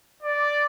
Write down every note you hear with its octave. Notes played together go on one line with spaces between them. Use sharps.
D5